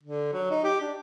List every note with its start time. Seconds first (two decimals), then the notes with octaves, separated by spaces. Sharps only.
0.03 D3
0.33 F#3
0.51 D#4
0.64 G4
0.81 D4